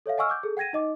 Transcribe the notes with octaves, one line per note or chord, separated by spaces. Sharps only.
A4 C#5 E5 F5
D#5 F#5 G#5 C#6 E6 F6
D6 G6
G#4 A4
F#5 G5 G#6 A#6 D#7
D#4 D#5 D6